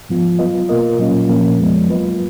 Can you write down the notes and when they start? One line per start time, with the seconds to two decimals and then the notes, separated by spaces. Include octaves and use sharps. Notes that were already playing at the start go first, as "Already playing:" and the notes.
0.09 G#2 F3 B3 F4
0.39 F#3 B3 F4 B4 D#5
0.69 B2 A#3 F4 A#4 D#5
0.98 A#2 F#3 A#3 C#4 F4
1.29 A#2 F3 A#3 C#4
1.58 F2 F3 G#3 B3
1.88 F#3 A#3 F4 B4 D#5